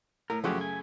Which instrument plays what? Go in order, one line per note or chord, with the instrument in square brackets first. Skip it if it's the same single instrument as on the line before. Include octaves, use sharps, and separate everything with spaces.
[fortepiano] A2 [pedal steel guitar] A#4
[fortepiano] F#2 C#3 A3 [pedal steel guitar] F3 F#4 G4
[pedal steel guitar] G#5